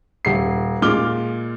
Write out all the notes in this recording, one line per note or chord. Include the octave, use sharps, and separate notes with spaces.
D#1 C7
A#2 G#3 D6 F6 G7